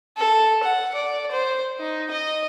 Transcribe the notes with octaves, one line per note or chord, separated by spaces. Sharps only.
A4
F#5
D5
C5
D#4
D#5